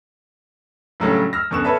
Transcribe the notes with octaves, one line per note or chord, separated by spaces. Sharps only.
A2 C#3 F#3 G3 A3 D4
E6 F6 A#6
F#2 B2 D3 C#6 F#6 E7
A4 B4 C#5 D5 E5 A5